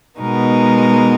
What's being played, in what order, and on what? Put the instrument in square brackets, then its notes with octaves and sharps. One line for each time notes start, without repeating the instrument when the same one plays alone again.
[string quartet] B2 G#3 B3 D#4 A#4